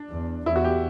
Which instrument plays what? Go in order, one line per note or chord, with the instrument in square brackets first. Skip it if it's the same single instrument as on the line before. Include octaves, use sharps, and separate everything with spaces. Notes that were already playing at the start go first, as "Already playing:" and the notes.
Already playing: [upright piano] D4
[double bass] E2
[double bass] E2 [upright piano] E4
[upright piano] F#4
G4